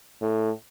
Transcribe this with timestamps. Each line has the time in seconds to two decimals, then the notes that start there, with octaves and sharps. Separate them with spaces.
0.22 A2